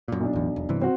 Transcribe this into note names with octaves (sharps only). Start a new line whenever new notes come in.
F#2 A#2
B1 D4
A1 E2
E1
G2 C3 E3
C4 F#4